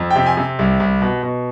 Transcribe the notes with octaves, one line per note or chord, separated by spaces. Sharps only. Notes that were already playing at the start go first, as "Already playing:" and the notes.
Already playing: F2
C3 G5
G#5
C3
C2
C2
B2
B2